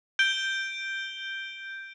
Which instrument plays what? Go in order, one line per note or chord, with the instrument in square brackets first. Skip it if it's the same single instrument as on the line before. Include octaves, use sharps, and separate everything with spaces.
[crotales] G6 D7 G7